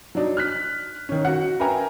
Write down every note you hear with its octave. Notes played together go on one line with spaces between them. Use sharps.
F#3 D4 D#4
F6 F#6 B6
D#3 C#4
F#4 F#5
A#4 B4 E5 G5 G#5 A#5